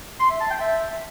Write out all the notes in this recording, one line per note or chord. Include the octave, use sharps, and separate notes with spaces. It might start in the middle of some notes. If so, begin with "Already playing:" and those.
C6
E5
A5
G5
E5